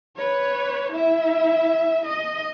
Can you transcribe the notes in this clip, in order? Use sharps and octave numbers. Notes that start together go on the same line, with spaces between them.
B4 C#5
E4 E5
D#5